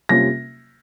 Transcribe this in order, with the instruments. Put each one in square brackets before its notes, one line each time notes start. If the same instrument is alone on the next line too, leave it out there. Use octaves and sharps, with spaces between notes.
[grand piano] C3 G3 A#3 C#4 F4 A#6